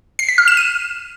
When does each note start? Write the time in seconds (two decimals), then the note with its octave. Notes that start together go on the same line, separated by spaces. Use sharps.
0.19 C7
0.29 B6
0.38 F6
0.48 E7
0.57 D#7